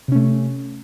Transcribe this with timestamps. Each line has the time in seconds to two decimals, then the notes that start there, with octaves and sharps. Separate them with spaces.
0.08 C3
0.12 C#4
0.15 A3